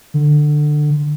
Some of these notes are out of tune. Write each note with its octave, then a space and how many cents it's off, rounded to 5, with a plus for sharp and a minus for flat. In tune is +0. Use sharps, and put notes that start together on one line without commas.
D3 +20